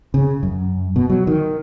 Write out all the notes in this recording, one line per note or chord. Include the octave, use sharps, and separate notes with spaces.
C#3
F#2
B2
F#3
D#3